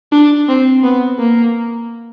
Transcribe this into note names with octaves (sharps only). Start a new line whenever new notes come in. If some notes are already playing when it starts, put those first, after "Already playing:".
D4
C4
B3
A#3